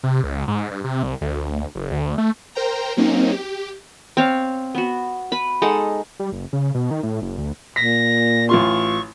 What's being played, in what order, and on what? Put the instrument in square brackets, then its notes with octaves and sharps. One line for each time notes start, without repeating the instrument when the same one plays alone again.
[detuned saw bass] C3
C#2
G#2
G2
C3
C2
D2
F#1
D2
A3
[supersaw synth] A#4 C5 G5 A#5
F#3 A#3 C4 C#4 D#4
G4
[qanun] C4 C#5 F5
B3 F#4
B4 B5
G#3 D#4 A4 F#5
[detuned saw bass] G3
F#1
C#3
B2
D#3
A2
F#1
D2
[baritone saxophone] A#2 [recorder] A#6 [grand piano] B6
[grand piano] A1 F4 C6 [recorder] C#6